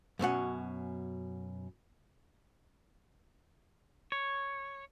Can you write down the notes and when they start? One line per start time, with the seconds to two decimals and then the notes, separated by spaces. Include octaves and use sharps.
0.19 F#2 B2 C#4 F#5
4.12 C#5